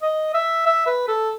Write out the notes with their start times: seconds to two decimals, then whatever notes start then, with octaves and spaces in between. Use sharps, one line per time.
0.02 D#5
0.34 E5
0.66 E5
0.86 B4
1.08 A4